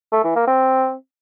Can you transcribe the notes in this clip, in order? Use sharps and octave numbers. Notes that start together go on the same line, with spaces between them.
A3
E3
A#3
C4